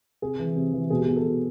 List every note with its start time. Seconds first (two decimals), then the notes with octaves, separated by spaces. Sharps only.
0.22 C3 G#4
0.39 E3
0.56 C3
0.73 E3
0.90 B2 G#4
0.99 G4
1.08 B2 G#4
1.16 A4
1.25 B2